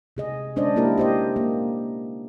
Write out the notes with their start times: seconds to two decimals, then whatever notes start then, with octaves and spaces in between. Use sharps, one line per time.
0.17 C3 G#4 D#5
0.56 G#3 C#4 D4 C5 D5 D#5
0.76 A#3 E4 G4 A#4
0.98 G4 C5 D#5
1.36 A#3